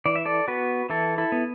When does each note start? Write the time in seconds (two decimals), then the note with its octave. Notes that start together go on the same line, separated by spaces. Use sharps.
0.06 E3 D5
0.16 E5
0.25 A4 D5
0.48 B3 F#4 B4
0.90 E3 E4 A4
1.18 E4 A4
1.32 B3